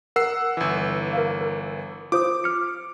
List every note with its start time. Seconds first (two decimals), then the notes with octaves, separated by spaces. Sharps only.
0.16 A#4 F#5 E6 C7
0.57 G1 E3
1.13 A#4 F5
1.41 A#4
2.12 F4 C5 D6 D#6
2.44 F6 C#7